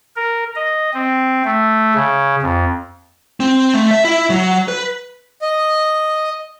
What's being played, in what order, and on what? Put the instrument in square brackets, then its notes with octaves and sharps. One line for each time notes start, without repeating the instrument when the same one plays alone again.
[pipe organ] A#4
D#5
C4
A3
C#3
F2
[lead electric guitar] C4
A3
E5
E4
F#3
B4
[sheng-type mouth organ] D#5